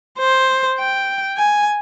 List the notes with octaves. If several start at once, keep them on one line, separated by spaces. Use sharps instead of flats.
C5
G5
G#5